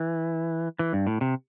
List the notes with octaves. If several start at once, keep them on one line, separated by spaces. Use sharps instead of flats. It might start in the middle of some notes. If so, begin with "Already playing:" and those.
Already playing: E3
E3
G2
A2
C3